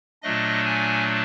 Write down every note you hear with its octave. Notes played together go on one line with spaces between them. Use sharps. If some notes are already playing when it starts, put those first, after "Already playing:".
A#2 F#3 A3 D4 D#5
G#5